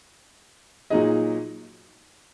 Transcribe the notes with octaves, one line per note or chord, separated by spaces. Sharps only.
A#2 F#3 D#4 G#4 D#5